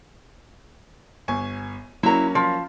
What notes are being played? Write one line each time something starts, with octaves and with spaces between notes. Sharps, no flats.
G1 G#5 C#6
F#3 A#3 C#4 E4 A#5
F3